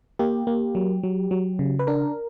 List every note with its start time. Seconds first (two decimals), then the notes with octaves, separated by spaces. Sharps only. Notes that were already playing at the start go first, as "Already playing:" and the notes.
0.19 A#3 G4
0.47 A#3
0.75 F#3
1.03 F#3
1.31 F#3
1.59 C#3
1.79 B4
1.87 D4 A#4